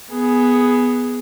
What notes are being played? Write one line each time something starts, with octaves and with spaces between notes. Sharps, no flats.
B3 G#4